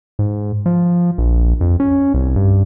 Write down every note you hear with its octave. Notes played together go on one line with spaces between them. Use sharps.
G#2
F3
A#1
F2
C#4
C2
G2